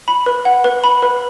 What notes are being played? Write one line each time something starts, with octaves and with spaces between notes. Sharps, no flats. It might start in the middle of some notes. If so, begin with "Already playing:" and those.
B5
B4
F#5
B4
B5
B4